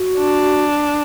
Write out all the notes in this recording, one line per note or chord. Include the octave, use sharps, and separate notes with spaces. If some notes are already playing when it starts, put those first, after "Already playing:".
Already playing: F#4
D4